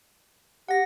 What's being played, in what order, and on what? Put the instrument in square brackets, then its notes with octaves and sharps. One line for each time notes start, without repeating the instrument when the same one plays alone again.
[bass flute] G4 [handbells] F#5 A#6